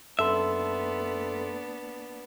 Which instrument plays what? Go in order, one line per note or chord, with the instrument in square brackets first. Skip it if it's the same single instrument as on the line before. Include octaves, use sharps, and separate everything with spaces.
[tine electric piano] F#2 A4 C6 [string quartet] A#3 B3 D4 [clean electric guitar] E5